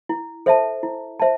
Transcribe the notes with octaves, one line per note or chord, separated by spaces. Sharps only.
E4
A4 C5 E5 A5
E4
C5 E5 A5